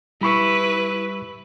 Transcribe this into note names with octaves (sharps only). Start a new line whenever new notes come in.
G3 E4 B4 B5 C#6